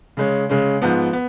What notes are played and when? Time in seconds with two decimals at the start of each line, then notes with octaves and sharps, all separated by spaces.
0.17 C#3 G#3 C#4
0.49 C#3 G#3 C#4
0.82 G#2 F3 B3
1.13 B3